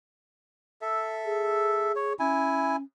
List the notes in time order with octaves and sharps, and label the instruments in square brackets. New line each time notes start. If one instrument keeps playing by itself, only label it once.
[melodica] A4 E5
[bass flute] G#4
[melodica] C#5
[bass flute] C#4 [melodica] E4 G#5